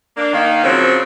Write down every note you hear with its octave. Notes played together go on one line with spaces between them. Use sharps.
A#3 D4
D#3 A#3
C#3 F3 F#3 A#3 C4 F4